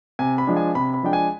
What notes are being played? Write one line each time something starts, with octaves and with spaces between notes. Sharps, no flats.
C3 G#5
B5
F3 G#3 D4
G#5
C3 B5
B5
F3 G#3 D4 G5
G#5